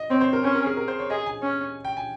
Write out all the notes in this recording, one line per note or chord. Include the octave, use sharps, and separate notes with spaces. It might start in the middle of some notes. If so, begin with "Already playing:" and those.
Already playing: D#5
C4 C#5
C5
A#4
C#4 C5
A#4
G#4
A#4
C5
C#5
G#4 D#5
G#5
C#4
G5
G#5